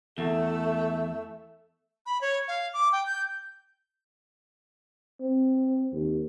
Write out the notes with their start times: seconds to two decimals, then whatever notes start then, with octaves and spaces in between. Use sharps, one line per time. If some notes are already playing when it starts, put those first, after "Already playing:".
0.18 E2 A3 E5
2.06 B5
2.21 C#5
2.48 F5
2.73 D6
2.92 G5
3.06 G6
5.21 C4
5.93 D#2